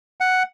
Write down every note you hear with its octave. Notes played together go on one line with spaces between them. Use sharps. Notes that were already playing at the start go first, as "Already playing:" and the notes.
F#5